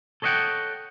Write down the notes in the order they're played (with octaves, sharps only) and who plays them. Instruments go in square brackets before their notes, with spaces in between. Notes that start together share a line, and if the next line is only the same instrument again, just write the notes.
[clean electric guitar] A4 C#5 D#5 E5 F#5 G5